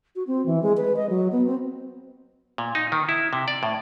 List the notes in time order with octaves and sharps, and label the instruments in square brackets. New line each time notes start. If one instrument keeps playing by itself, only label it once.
[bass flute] F#4
C4
E3
G#3
B4
D#5
F#3
B3
C4
[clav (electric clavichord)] A#2
D#4
D#3
E4
C3
D5
A2